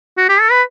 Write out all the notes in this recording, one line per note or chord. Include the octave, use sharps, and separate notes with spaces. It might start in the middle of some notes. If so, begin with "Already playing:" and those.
F#4
G4
A4
B4